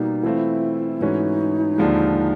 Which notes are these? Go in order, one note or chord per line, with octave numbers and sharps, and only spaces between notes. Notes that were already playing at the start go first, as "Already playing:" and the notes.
Already playing: B2 G3 A#3 D#4
E3 A3 C4 E4 F4
G#2 E3 A3 C#4 D#4 F#4
D#2 D3 F3 G#3